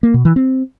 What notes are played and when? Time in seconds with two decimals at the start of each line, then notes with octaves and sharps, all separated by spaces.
0.03 A#3
0.14 B2
0.25 E3
0.36 C4